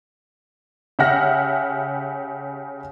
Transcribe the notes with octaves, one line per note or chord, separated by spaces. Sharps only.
C#3 G4 E5 F#5 F6 A#6